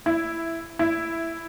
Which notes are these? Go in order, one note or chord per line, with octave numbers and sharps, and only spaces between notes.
E4
E4